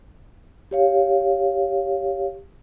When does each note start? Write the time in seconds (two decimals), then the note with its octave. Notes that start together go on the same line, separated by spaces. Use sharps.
0.71 G4 C#5 F5